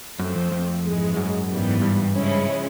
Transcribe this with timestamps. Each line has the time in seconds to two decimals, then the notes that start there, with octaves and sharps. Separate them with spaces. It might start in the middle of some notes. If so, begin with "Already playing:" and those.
0.19 F#2 F3 A3 C4
0.36 F2
0.52 F2
0.85 G#2 E3 G#3
1.17 F#2
1.49 G#2 E3 G3 B3
1.81 G2
2.13 C#3 F3 G#3 C#4 E4